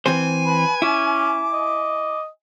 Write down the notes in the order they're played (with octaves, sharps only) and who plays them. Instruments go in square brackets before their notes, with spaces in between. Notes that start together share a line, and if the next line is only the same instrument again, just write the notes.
[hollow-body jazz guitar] E3 C4 C5 [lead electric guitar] G#5
[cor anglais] B4 [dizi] B5
[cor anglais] C#4 [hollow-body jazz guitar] E4 [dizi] D6
[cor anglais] D#5